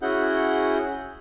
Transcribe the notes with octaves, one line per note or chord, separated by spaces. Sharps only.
C#4 E4 F#4 G#4 F#5 G6